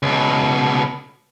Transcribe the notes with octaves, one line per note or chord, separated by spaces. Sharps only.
C#2 B2